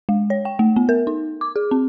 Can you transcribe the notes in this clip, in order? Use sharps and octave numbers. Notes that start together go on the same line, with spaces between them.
G#3
C#5
G5
A3
B3
A#4
D#4
D6
G#4
C4